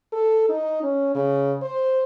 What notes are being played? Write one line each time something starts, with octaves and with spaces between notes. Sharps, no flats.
A4
D#4
C#4
C#3
C5